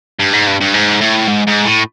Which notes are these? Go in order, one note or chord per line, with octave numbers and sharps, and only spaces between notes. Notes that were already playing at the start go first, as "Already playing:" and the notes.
G2
G#2
G2
G2
G#2
A2
G#2
G#2
A2